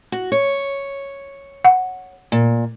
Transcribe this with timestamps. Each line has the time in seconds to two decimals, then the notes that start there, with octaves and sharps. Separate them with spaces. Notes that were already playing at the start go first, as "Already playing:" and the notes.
0.12 F#4
0.32 C#5
1.65 F#5
2.32 A#2